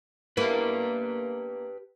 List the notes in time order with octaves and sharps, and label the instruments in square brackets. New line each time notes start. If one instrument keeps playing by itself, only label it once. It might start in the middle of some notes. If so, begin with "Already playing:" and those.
[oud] A#3 B3 E4 [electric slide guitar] G4 B4